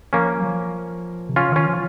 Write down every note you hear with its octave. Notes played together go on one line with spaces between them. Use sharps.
F3 A#3 C#4
F#3
F3
C3
C#3 C#4 F4
D#3 C#4 F4
F3